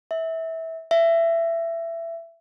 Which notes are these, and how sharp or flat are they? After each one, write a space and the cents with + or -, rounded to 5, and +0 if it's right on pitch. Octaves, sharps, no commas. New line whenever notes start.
E5 -20
E5 +20